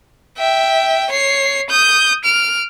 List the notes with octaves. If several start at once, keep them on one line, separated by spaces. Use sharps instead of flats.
E5 G5
C#5 C7
D#6 G6
F6 D7